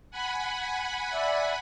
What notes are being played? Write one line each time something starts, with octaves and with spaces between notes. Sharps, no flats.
F#5 G#5 B5
D5 E5